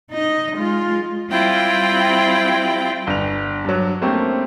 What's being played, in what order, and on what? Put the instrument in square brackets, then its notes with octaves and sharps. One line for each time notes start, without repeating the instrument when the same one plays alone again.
[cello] D#4 D#5
G#3 F4
[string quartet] G3 C4 E4 F4 G5
[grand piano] G1 F7
G2 F#3
A3 A#3 C4 C#4 G4